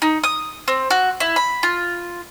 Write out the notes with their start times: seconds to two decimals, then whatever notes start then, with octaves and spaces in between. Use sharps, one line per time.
0.02 D#4
0.23 D#6
0.68 C4
0.90 F#4
1.20 E4
1.36 B5
1.63 F4